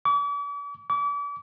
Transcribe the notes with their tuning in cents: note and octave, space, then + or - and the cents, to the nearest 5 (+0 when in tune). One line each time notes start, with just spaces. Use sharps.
D6 -45
D6 -40